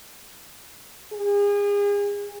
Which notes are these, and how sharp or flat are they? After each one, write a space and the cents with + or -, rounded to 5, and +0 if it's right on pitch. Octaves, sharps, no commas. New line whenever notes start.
G#4 -35